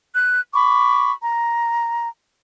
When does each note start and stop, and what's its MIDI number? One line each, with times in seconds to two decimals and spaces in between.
0.16 0.41 90
0.53 1.11 83
0.53 1.11 85
0.53 1.11 86
1.22 2.08 82